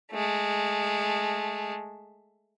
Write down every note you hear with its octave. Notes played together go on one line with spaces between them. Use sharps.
G#3 A3